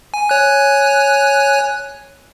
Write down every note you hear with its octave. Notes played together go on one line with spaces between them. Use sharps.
G#5
C#5 G#5 F#6